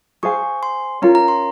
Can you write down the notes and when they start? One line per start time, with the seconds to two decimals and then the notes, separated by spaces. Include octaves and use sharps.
0.23 G#4 C5 F5 G#5 C#6
0.63 C6
1.02 C#4 F4 A#4 A#5
1.15 A#5
1.28 C6